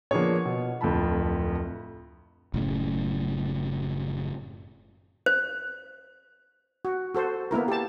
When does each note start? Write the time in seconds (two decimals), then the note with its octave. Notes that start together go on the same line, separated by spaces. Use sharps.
0.11 F3 A#3 B3 D4 G#4 C#5
0.45 B2
0.81 D1 F2 A3 F4 A5 B5
2.54 F#1 A2 C#3
5.26 C5
6.85 F#4
7.15 F#4 A4 C5
7.51 A#3 B3 E4 A#4
7.68 G4 A5